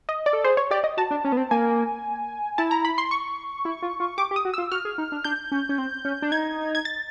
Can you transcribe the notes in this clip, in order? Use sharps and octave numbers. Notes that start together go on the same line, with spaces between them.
D#5
D5
A4
G#4 C5
C#5
G4 D5
D#5
F#4 A5
D4
C#4
B3
C4
A#3 G#5
E4 A5
A#5
B5
C6
C#6
E4
F4
F4
G4 D6
G4
D#6
F#4
F4 E6
F#4 F6
G#4
D#4
D4
D4 G6
C#4
C#4
C4
C#4
D4
D#4 G#6
G#6
A6